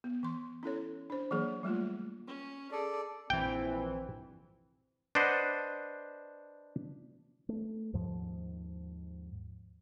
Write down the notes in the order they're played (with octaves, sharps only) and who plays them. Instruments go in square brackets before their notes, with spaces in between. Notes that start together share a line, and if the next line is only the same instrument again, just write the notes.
[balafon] B3
E3 C6
C#4 E4 A4 C#5
D4 C5
E3 F#3 A#3 G#4
F#3 G3 A3 A#3 F4
[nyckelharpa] C#4
[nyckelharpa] G#4 [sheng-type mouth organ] A4 D5
[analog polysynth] A#1 E3 [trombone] C4 [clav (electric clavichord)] G5
[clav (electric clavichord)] D4 B4 C5 D#5 F#5
[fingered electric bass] A3
D#2 G#2 F3